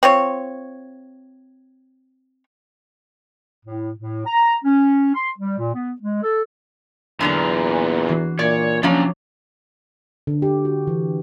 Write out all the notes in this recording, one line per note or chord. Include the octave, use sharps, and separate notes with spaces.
C4 F4 C#5
A2
A2
A#5
C#4
C6
G3
A#2
B3
G#3
A4
E2 A#2 D3 F#3 A#3 B3 D4 A#5
E3 F#4 C7
A#2 C#5 D5
C3 F3 F#3 A#3 C#4 D4 C#5 A#5
D3
G4
F#4
E3